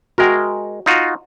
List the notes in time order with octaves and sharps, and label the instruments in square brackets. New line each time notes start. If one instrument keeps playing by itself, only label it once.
[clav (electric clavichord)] G#3 A#4 [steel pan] F#4 E5 G5
[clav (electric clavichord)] D#4 F4 F#4